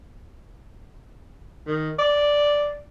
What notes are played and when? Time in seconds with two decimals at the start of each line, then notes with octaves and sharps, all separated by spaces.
1.67 D#3
1.99 D5